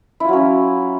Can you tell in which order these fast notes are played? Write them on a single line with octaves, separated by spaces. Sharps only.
E4 F4 F#3 C#4